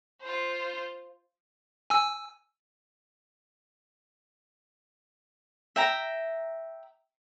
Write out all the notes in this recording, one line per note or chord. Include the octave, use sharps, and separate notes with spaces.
F4 C5
G#5 E6
E5 G5 A#5